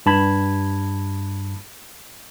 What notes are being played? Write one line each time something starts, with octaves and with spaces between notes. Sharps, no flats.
G2 A5 B5 G#6